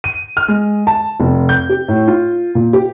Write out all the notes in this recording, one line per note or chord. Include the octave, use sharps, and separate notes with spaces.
D#7
F6
G#3
A5
F1
G6
G4
A2
F4
A#2
G4